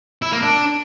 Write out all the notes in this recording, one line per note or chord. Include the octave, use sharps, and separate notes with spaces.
E4
A#3
D4